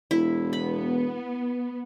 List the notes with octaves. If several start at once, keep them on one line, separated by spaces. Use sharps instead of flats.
E1 E4
B3 B5